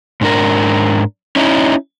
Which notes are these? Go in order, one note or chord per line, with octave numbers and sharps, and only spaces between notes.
G#2 D4 A#4
C#4 D#4 E4